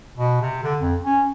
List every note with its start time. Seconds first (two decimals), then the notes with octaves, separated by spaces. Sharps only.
0.17 B2
0.41 C3
0.63 D3
0.81 F2
1.04 C#4